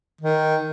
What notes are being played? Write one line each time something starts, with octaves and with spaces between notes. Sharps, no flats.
D#3